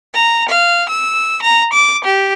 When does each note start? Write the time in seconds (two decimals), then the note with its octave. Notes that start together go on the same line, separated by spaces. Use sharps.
0.14 A#5
0.49 F5
0.89 E6
1.42 A#5
1.73 D6
2.04 G4